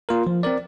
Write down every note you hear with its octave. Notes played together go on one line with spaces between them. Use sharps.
A#3 F4 A#4
F3
C4 A#4 D5